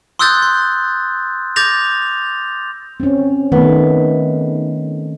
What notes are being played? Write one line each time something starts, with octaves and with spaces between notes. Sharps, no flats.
C6 D#6 E6 F#6 G6 A6
C6
D6 G6 A6 A#6 F7
C4 C#4
D#3 A3 B3